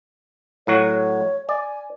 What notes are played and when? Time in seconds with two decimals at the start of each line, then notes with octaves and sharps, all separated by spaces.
0.67 A2 F#3 F#4 C#5
1.49 D5 G#5